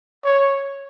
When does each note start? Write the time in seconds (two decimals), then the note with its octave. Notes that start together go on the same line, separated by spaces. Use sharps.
0.24 C#5